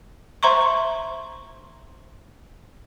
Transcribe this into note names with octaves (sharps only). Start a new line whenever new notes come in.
C5 E5 A#5 C6 C#6